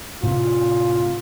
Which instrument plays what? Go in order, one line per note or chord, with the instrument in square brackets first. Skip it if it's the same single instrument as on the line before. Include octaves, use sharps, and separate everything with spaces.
[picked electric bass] A2 C3 [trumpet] F4